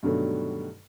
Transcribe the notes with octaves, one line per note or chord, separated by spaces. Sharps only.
G2 B2 D3 D#3 F#3 A3